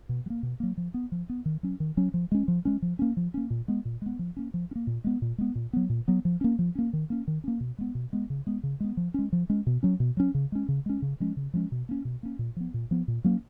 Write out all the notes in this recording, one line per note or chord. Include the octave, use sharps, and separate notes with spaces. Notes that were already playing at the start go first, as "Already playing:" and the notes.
B2
F#3
A#3
B2
F#3 A#3
F3
B3
F3
B3
D#3
F#3 C#4
D#3
F#3 C#4
F3
G#3 C#4
F3
G#3 C#4
F3
A#3 C#4
F3
A#3 C#4
A#2
G#3 B3
A#2
G#3 B3
F3
A#3 C#4
F3
C#4
A#3
A#2
G#3 B3
A#2
G#3 B3
A#2
F#3 B3
A#2
F#3 B3
F3
A#3 C#4
F3
A#3 C#4
D#3
A#3 C#4
D#3
A#3 C#4
B2
G#3 B3
B2
G#3 B3
C#3
G#3 B3
C#3
G#3 B3
F3
G#3 C#4
F3
G#3 C#4
B2
F#3 C#4
B2
F#3 C#4
C#3
G#3 C#4
C#3
G#3 C#4
C#3
F3 G#3 C#4
C#3
F3 G#3 C#4
B2
A#3 C#4
B2
A#3 C#4
A#2
F3 B3
A#2
F3 B3
A#2
F#3 A#3 C#4